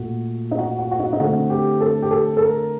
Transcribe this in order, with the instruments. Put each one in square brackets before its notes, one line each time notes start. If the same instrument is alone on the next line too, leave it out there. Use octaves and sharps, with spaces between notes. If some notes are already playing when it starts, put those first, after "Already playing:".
Already playing: [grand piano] A#2 A3 F#4
D#4
F#4
F#4
F#4
D#4
D#4
D3 A3 C4 F#4
G4
A4
G4
A4
A4
A#4